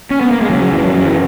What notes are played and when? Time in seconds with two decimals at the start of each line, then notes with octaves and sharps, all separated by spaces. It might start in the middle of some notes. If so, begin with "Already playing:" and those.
0.11 C#4
0.21 B3
0.31 A#3
0.41 G#3
0.50 C#3 F#3
0.62 F#3
0.72 F#2 E3
0.84 F#3
0.94 C#3 F#3
1.05 E3